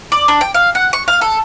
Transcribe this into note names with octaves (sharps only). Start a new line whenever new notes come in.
D5
D4
G5
F5
F#5
C#6
F5
A4